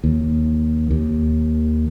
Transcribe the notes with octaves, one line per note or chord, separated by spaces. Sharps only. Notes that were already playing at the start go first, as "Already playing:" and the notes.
D#2
D#2